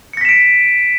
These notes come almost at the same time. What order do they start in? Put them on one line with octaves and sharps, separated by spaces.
C#7 A#6 B6 E7 D7